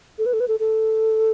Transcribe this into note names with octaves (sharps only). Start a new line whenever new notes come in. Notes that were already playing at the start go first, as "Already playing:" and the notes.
A4
B4
A4
B4
A4
A4